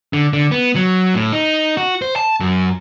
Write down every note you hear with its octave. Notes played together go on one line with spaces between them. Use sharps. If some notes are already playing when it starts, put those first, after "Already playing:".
D3
D3
B3
F#3
A2
D#4
F#4
C5
A5
F#2